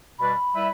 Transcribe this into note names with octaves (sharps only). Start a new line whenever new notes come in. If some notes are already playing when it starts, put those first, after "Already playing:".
B2 G3 D4 B4 B5
G3 E4 B4 E5